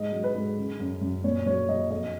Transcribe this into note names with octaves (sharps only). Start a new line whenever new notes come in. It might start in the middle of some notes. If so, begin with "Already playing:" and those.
Already playing: G#2 D#5
F#3
B4
G#2
C#3
F#2
F#2
A#2 C#5
F#3 C#5
F#3 D#5
F2 D#5